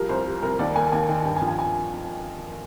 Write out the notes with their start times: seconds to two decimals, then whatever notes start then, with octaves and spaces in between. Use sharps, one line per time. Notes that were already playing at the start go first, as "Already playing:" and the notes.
Already playing: F3 G3 A#4
0.09 C2 C5
0.26 G3
0.43 C2 A#4
0.59 D#2 D5
0.76 A#3 G#5
0.92 D#2 G#5
1.09 D#3 G5
1.25 G2 G5
1.36 G#5
1.42 F3
1.48 G#5
1.59 G#5